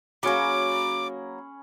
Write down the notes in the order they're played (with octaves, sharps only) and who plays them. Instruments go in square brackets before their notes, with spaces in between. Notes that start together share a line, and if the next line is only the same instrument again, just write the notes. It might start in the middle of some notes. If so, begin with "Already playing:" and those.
[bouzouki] F#3 A#3 [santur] C#4 G#4 B5 [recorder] D6